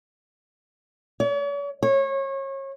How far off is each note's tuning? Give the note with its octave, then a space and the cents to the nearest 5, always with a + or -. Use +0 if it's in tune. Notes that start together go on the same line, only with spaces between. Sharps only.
C#5 +45
C#5 -30